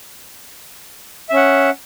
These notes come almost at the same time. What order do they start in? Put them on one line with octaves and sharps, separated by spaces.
E5 C#4 F#5